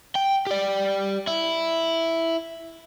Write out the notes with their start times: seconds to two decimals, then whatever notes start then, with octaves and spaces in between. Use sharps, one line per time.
0.15 G5
0.47 G4 D5
1.27 E4